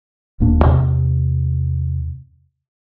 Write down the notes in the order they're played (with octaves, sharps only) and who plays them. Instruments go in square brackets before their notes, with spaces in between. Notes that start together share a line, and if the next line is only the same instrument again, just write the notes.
[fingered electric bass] D#1 A2 A#3 D4
E2 C3